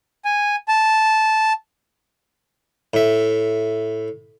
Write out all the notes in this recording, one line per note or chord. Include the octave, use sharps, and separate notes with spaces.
G#5
A5
A2 E5